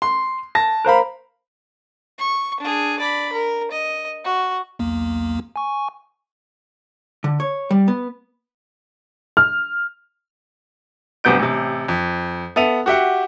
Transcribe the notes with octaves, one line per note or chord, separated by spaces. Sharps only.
C6
A5 A#6
A#4 C5 F5 B5
C#6
D4 G#4
D5 B5
A#4
D#5
F#4
B1 E2 A#3
G#5 C#6
D3
C#5
G3
B3
F6
D1 G1 C3 B3 G6 D7
A1 C3
F2
B3 A4 E5 D#7 F7
F#4 G4 E5 F#5